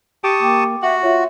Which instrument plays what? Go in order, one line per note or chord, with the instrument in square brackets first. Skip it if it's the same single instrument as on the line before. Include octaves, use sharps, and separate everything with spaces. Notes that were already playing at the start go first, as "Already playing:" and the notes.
[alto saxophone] G4 [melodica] A5 C#6 D#6
[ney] A#3 [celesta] G5 D6
[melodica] F#4 [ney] E5 [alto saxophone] F#5
[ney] F4 [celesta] C#5 E5